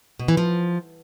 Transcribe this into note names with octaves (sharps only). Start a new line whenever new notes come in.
B2
E3
F3